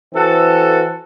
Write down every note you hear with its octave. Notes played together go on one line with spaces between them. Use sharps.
E3 C4 F#4 A4